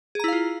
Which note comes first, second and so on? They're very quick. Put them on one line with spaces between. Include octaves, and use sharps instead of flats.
G#4 A#5 E4 F5 F4